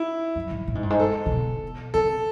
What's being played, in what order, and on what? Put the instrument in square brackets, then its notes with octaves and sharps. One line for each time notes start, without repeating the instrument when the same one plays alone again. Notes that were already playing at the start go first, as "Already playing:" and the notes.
Already playing: [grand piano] E4
[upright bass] F#2
G#2
A2
G#2
G2
G#2
[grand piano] A4
[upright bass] C3
B2
[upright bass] C3 [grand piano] A4